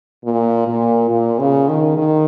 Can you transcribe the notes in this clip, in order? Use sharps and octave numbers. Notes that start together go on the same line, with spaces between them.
A#2
A#2
A#2
C#3
D#3
D#3